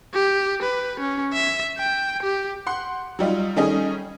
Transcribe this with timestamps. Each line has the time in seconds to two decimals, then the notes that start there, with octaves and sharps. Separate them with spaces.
0.14 G4
0.63 B4
1.00 C#4
1.33 E5
1.78 G5
2.23 G4
2.67 F#5 C6
3.19 F#3 G3 D#4 F4
3.56 D#3 G3 A3 C#4 G#4 D#5